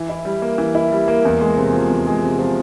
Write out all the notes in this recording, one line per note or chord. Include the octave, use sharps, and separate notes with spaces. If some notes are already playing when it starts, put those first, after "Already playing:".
Already playing: E3
E4
G3
A#3
E3
E4
G3
A#3
E2
G#3
C3
F3
E2
G#3
C3
F3